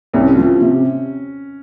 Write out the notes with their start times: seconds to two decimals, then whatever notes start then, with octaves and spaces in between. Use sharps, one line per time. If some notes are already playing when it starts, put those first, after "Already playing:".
0.14 C2 C#4
0.37 F3
0.61 C3